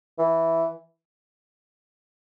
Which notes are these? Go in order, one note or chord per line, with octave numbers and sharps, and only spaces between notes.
E3